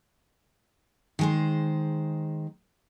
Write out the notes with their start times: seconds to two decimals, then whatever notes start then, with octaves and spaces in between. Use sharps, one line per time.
1.19 D#3 G#3 C5